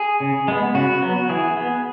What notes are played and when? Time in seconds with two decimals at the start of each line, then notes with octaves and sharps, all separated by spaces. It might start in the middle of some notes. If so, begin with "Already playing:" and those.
Already playing: G#4
0.20 C#3
0.48 G#3 B3
0.75 C#3 F#4
1.02 F#3 B3
1.29 E3 G#4
1.57 B3